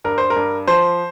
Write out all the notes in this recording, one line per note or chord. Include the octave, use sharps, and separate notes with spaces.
G2 A#4
C5
A#4
G2
F3 C5